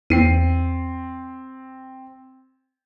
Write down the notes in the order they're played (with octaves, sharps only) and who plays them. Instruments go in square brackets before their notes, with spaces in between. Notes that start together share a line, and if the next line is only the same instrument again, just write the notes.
[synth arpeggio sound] E2 [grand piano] C4 C7 D#7